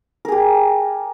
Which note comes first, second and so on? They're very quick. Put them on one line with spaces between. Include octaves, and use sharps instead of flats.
A#4 G#4 G4